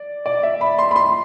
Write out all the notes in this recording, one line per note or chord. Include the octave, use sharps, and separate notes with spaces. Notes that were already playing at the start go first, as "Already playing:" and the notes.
Already playing: D5
D5
E5
B5
C6
B5
C6